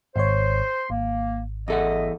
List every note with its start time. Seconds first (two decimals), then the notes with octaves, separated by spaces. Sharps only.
0.16 G#1 C5 C#5 C6
0.90 G#1 A#3
1.68 E2 A4 D#5 E5 F#5